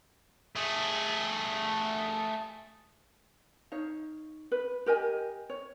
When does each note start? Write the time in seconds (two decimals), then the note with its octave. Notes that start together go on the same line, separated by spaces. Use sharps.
0.56 A3 G#4
3.72 D#4 C#5 F5
4.52 B4
4.86 G4 A#4 D#5 G#5
5.50 C#5